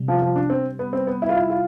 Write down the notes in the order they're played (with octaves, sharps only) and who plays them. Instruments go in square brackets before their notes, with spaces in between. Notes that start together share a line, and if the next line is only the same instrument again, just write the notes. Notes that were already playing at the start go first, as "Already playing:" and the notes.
Already playing: [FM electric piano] C3 G3
[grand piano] F3
F3
D4
C4
B3
C4
B3
E4
F4
E4
F4